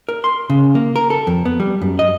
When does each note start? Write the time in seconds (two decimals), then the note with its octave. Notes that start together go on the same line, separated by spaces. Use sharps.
0.09 A#4
0.24 C6
0.50 C#3
0.75 A#3
0.96 A#4
1.10 A4
1.27 F2
1.45 B3
1.60 G3
1.82 F#2
1.99 D#5